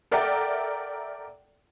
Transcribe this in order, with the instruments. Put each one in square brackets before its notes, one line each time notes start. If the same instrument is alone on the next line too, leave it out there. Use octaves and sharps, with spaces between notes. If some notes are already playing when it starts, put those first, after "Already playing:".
[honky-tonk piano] A4 A#4 D5 E5 F#5 G5